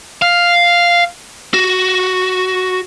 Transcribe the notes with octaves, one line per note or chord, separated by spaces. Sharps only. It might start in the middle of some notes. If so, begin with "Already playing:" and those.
F5
F#4